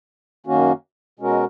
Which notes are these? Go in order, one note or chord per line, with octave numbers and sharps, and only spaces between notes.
F#2 D#3 A#3 C#4 F#4
B2 G#3 C#4 F#4 A#4